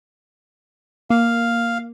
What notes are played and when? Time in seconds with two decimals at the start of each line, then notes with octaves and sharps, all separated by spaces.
1.10 A#3 F5